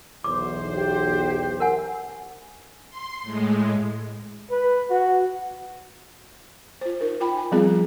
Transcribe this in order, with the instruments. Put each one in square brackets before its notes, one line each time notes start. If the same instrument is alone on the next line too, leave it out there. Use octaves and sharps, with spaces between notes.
[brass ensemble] B1 E2 C5 [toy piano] D6
[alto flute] G4
[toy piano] A#4 F#5 G#5
[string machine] C6
A2 G#3
[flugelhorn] B4
F#4
[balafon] F4 C5
D#4 A#4
F4 G5 B5
G#5
F3 G3 B3 C4 F4 G#4